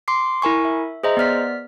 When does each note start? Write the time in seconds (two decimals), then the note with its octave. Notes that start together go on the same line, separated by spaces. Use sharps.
0.08 C6 D6 C7
0.42 E4 A#4 G#5 C#6
0.65 E5
1.03 G#4 C5 D#5 E5 A#5
1.17 B3 D5 F6 B6